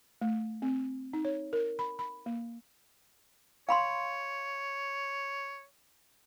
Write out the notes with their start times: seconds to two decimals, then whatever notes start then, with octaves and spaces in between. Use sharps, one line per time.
0.21 A3
0.62 C4
1.13 D#4
1.25 C#5
1.53 A#4
1.79 B5
1.99 B5
2.26 A#3
3.69 C#5 F5 B5 C6